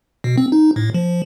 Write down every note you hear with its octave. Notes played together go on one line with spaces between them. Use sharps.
B2
C4
D#4
A2
F3